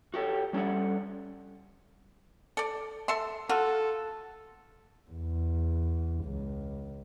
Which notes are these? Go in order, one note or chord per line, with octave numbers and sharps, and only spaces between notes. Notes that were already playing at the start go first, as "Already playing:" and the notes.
F#4 G4 A4 C#5
G3 C#4 A4 D5 F#5
A4 D5
A4 E5 C6
F4 F#4 A4
E2
C#2